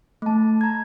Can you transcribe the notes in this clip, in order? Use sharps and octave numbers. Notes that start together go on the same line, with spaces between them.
A3 A5
A#5 G#6